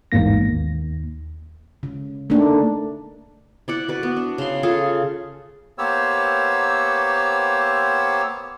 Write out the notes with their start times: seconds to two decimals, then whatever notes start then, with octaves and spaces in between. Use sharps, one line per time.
0.12 A1 E2 G#2 A#3 A#6
0.48 D#2
1.83 C#3
2.30 A3 A#3 D4 D#4
3.68 E4 D5 F#5
3.88 F#4 B4 D5
4.03 B3
4.17 D4
4.38 C#3 C6
4.63 F4 G#4 A4
5.78 A#3 B3 G4 C5 C#5 E6